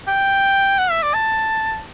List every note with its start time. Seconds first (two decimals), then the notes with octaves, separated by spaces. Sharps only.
0.08 G5
0.79 F#5
0.90 E5
1.02 D5
1.14 A5